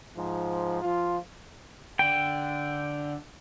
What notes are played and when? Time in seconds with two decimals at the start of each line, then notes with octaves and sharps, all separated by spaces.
0.15 G#2 F3
0.81 F3 F4
1.99 D3 G5